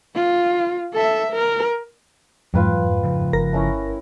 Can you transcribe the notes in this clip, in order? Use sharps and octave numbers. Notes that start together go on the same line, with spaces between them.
F4
A4 E5
A#4
F2 G#2 E3 F#3 F4 B4 G5
C#3 F3
G1 A#4 A#6
A3 C#4 E4